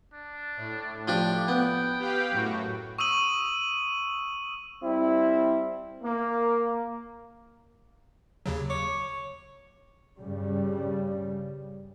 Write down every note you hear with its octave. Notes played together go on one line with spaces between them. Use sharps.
D4
A2
F3 D4 G4
B3 G5
G4 B4 F5
F#2 A2 F#4
C#6 D#6 E6 D#7 F#7
G3 C4 E4
A#3
D#2 C#3 F#3
C#5 D6
G2 C#3 G3